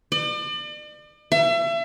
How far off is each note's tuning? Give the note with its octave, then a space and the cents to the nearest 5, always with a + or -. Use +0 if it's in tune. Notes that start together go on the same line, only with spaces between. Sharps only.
D5 +40
E5 +35